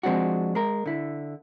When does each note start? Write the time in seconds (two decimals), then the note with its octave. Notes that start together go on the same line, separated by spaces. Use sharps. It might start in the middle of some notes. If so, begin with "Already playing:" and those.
0.03 F3 G#3 C4 D4 F#4
0.55 G#3 A#4
0.86 D3 E4